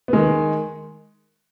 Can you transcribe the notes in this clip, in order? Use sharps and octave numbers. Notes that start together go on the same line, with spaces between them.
B3
D#3 G#3